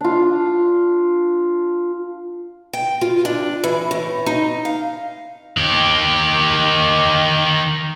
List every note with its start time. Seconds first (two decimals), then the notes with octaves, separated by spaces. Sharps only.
0.01 D4 F4
2.73 G5
3.01 F4
3.25 D4
3.64 E3
3.91 A2
4.26 D#4
4.65 F5
5.57 D#3 G4